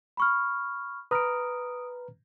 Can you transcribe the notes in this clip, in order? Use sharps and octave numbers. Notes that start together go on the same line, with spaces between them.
B5 C#6 F6
B4 A#5 D#6 F6 D7